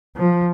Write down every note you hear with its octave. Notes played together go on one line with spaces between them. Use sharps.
F3